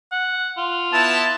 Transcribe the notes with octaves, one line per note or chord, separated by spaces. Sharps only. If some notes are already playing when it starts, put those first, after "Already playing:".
F#5
F4
B3 E4 A5